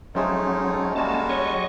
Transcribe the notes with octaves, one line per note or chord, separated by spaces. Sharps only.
F3 F#3 G#3 A3 C4 C#4 D#4 G#4
A4
G3 G#3 A#3 C#4 F#4 A5
C#5 D#5 C#6
F#3